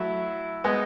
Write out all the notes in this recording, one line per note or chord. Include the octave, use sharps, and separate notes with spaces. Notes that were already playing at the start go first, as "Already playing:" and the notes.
Already playing: F#3 A3 E4
G#3 B3 D#4